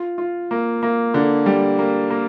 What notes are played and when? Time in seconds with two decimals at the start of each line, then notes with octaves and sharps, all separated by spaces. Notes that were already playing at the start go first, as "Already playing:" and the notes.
Already playing: F4
0.18 F4
0.51 A#3
0.83 A#3
1.14 D3
1.46 G3
1.79 A#3
2.10 A#3